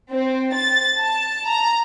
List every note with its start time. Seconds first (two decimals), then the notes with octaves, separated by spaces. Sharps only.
0.12 C4
0.55 A6
0.99 A5
1.47 A#5